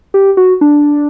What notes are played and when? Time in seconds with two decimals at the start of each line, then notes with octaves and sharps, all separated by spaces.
0.14 G4
0.37 F#4
0.61 D4